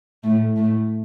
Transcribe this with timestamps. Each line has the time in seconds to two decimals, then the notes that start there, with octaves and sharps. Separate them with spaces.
0.23 A2 A3
0.56 A2 A3